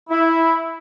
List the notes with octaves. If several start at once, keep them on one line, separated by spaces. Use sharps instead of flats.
E4